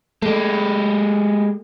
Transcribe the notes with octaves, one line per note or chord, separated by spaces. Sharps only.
G#3 A3 G4